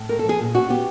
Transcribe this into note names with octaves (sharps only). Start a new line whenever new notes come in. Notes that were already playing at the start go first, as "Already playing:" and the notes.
Already playing: A2
A3 A#4
A4
F3 G#4
A#2
C#4 F#4
B3 G4